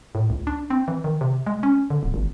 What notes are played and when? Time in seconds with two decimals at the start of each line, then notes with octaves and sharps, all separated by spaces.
0.15 A2
0.30 C#2
0.47 D4
0.70 C4
0.88 E3
1.04 D#3
1.21 C3
1.46 G#3
1.63 C#4
1.90 D3
2.03 D1
2.14 G#1